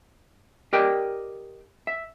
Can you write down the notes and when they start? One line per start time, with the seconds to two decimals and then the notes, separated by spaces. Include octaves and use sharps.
0.73 G4 A#4 D5 D#5 G5
1.87 E5